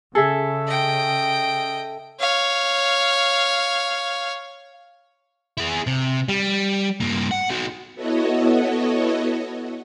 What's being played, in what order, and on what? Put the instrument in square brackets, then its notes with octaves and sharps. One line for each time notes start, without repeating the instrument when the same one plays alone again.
[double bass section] C#3 [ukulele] G#4 [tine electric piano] A4 E5
[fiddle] D#5 G5
[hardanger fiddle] C#5 F5
[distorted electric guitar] E4 G#4
C3
G3
G2 A#3
F#5
D#4 F#4
[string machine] B3 E4 F#4 A4 C#5 D#5